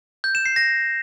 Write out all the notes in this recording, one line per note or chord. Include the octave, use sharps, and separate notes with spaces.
G6
E7
C7
A#6